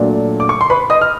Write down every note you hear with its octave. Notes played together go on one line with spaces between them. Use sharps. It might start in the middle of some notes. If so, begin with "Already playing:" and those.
Already playing: A#2 F#3 A3 D4
D6
C#6
C6
B4 B5
D#5 D#6
F6